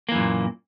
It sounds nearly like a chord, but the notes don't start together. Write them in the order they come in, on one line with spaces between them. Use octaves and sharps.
A#3 E3 F#2 A#2